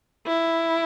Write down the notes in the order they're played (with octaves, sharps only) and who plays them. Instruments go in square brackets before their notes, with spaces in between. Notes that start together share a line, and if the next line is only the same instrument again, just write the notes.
[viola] E4